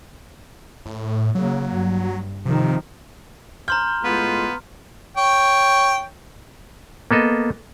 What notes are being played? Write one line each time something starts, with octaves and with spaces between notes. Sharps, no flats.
A2
C#3 F#3 A#3
G2
C3 D#3 F3
A#5 C6 F6 G6
A2 G#3 B3 F4
C#5 G5
A#3 B3 A4 D#5